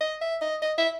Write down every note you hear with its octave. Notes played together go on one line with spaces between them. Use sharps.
D#5
E5
D#5
D#5
E5